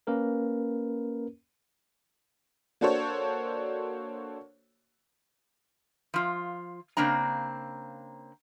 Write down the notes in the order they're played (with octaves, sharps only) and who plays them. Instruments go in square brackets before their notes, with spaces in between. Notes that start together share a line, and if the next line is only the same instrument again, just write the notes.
[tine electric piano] A#3 C#4 A#4 B4
[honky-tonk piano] A#3 D4 F#4 A4 C5 C#5
[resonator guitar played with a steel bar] F3 F4
C#3 A#3 C4 D4 A#5